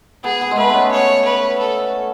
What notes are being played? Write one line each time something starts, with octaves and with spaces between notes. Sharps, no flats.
B3 G#4
B3
G#3
A3 B4
B3
C#4
C#5
B4
A4